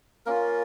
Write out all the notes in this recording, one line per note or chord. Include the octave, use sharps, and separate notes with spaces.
A#3 C#4 F4 A#4